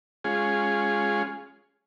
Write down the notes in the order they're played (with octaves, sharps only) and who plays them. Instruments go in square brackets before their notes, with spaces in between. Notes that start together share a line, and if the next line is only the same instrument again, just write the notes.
[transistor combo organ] G#3 C#4 F4 G#4